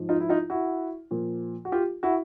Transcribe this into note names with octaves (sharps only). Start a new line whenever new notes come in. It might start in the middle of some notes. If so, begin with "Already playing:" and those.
Already playing: G#2 F3
D#4 F4
E4
D#4 F4
E4 F#4
A#2 F3
F#4
F4 G4
E4 F#4